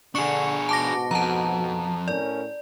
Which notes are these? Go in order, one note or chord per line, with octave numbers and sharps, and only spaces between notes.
D3 D4 G#4 C#6 C#7
G#2 B2 F#4 A5 D6 A#6
F2 A5 A#5
A2 C#4 A#4 D5